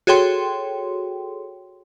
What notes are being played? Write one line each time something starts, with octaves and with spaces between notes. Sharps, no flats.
F#4 G#4 A4 C#5 G5 C6